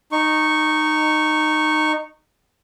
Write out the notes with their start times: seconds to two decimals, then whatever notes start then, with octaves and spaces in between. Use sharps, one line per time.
0.12 D#4 C#6